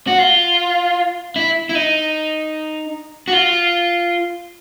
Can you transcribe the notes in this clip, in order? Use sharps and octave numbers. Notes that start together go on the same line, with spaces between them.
F#4
F4
E4
E4
D#4
F#4
F4